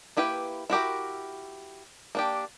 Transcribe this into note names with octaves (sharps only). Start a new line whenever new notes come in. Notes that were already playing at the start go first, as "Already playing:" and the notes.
A#3 E4 G4 B4 G5
E4 F#4 G4 A#4
A#3 D4 G4